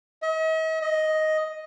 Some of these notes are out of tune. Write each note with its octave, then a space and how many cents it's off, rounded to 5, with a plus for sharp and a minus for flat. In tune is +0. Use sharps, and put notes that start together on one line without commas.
D#5 +45
D#5 +5